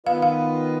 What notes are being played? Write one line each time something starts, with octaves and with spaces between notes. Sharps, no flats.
D#3 B3 F4 B4 D#5 F5
F5